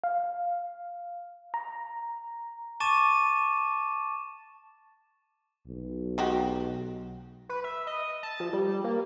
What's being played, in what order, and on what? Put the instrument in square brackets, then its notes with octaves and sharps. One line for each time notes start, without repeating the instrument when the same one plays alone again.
[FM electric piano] F5
A#5
[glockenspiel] A5 C#6 D6 A6 D#7 E7
[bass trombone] B1
[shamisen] G#3 F#4 G4
[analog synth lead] B4
E5
D#5
A5
F3
G3
A#3